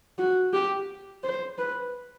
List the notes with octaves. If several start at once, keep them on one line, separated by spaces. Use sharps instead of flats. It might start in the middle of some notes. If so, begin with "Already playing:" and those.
F#4
G4
C5
B4